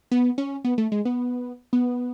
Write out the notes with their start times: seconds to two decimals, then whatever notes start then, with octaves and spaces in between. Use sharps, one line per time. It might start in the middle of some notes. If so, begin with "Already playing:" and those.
0.11 B3
0.38 C#4
0.65 B3
0.78 A3
0.92 G#3
1.05 B3
1.73 B3